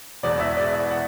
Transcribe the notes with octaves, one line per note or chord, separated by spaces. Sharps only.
E1 E2 B2 D5
E5
D5
E5
F#5